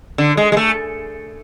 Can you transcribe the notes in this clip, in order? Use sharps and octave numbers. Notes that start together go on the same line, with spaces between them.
D3
G#3
G#3
A3